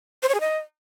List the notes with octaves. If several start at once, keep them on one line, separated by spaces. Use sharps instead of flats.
C5
C#5
G#4
D#5